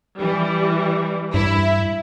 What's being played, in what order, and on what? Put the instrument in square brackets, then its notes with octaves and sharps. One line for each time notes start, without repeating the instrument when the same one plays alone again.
[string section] E3 G3
[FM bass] G2 [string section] E4 E5